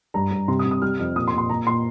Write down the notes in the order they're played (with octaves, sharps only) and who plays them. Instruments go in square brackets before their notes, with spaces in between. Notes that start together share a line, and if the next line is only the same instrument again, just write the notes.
[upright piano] G2 A#5
G2
C3 C6
D#6
C3
D#6
G3 F6
F2
A#2 D#6
C6
A#2
C6
A#2 A#5
A#2 C6